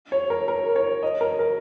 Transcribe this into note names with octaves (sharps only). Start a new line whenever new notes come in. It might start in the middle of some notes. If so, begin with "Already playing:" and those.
C#5
A#4
A#4
C#5
D#5
A#4
A#4